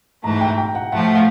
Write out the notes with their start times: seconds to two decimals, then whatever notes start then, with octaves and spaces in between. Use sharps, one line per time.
0.23 G#2 E3 A3 A#5
0.41 G5
0.58 G5
0.75 F#5
0.92 A2 F3 A3 F#5
1.15 F5